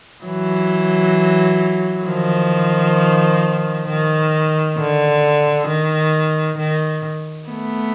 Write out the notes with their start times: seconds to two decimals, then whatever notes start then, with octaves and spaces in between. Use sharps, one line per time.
0.25 E3 F#3
2.06 D#3 F3
3.87 D#3
4.77 D3
5.67 D#3
6.58 D#3
7.48 A3 B3